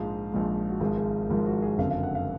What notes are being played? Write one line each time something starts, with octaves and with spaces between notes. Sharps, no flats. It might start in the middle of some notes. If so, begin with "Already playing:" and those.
Already playing: A#1 G#2 F3 G#3 F5
A#1 G#2 F3 G#3
F#4
G#1 G#2 F3 G#3 G#4
G#4
A#4
G#1 G#2 F3 G#3 A#4
F#4
G#4
F#1 F2 D3 F#3 F5
F5
F#5
F5